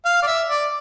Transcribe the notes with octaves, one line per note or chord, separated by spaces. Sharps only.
F5
D5
E5
D5